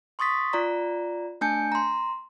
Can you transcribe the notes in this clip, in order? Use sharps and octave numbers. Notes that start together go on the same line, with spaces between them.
C6 C#6 D#6 A6 B6
F4 D5 A#5
A3 D4 G#5 A5 G6 C#7
A#5 C6